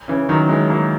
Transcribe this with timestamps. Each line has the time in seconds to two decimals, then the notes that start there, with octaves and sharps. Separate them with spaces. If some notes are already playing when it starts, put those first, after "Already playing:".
0.08 C#3 E3
0.29 D#3 F#3
0.49 E3 G#3
0.70 F#3 A#3